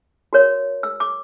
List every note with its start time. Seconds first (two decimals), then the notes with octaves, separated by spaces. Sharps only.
0.33 F#4 A#4 C#5
0.83 E6
1.00 D6